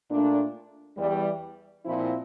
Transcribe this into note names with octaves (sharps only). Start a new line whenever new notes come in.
A#2 A3 D4
E2 E3 G3
A#2 F3 C4 E4